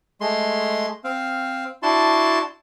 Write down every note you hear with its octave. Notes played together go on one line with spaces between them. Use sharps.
G#3 A3 C6
C4 F5
D4 E4 F#4 A5 C6